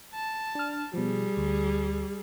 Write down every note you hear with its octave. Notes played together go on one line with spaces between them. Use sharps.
A5
D4 F6
B2 F3 G3 G#4
D2